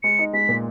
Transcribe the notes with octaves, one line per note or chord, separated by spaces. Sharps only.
G#3 C#7
D#4
G#3 B6
A#2